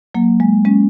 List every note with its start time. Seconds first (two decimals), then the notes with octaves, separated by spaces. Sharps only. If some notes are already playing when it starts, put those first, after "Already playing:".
0.15 F#3 A#3
0.40 G#3
0.65 G#3 C#4